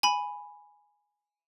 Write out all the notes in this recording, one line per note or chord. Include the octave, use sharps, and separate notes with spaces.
G#5 B5